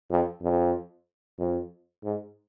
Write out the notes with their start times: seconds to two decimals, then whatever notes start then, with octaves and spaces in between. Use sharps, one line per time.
0.11 F2
0.43 F2
1.39 F2
2.03 G#2